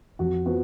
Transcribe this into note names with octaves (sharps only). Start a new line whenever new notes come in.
F2 F#4
F3 B3 F#4